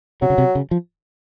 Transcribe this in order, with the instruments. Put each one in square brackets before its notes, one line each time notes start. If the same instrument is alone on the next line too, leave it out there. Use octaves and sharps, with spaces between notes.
[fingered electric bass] C3 [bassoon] F#3
[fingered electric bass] C#3
C3
C#3
F3